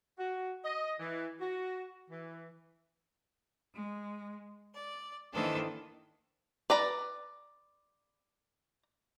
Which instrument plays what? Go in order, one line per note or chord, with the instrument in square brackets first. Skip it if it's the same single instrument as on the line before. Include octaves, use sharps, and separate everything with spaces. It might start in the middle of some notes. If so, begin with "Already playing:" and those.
[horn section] F#4
D#5
E3
F#4
E3
[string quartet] G#3
D5
D#3 E3 A#3 D4 A4 C5
[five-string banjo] B4 D5 A#5